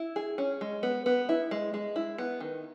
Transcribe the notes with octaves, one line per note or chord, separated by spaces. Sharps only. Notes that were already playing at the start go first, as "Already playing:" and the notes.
Already playing: E4
G#4
C#4
G#3
B3
B3
E4
G#3
G#3
E4
B3
D#3